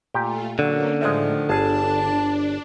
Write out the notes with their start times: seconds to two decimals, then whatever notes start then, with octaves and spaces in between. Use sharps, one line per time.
0.14 A#2 A3 F4 G4 G5
0.59 D3 F#3 A#3 C#4
1.01 A2 D#3 F3 G#3 D5 E5
1.49 G1 D4 G#4 A5